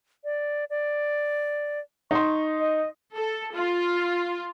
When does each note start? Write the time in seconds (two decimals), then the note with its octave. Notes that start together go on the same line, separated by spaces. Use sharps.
0.24 D5
0.70 D5
2.11 D#4 C6 C#6
2.60 D#5
3.16 A4
3.54 F4